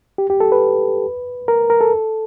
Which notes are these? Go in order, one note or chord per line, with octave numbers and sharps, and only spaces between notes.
G4
G4
A4
B4
A#4
A#4
A4